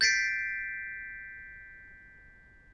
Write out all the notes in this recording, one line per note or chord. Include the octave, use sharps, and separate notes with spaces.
G6 A6 B6 C7 D7